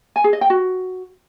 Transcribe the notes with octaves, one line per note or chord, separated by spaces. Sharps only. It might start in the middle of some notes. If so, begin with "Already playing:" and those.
G#5
G#4
D#5
G5
F#4